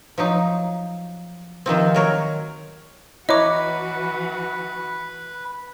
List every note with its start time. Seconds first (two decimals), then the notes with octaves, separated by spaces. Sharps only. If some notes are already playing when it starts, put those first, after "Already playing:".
0.18 F3 F#3 D#4
1.66 C3 D#3 F3 C4
1.94 F#3 A#4 C#5
3.29 E3 E4 F#4 B4 C#5 D#5 A#5 D6